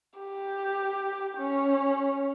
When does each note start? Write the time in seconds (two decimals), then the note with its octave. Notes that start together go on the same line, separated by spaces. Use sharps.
0.20 G4
1.38 C#4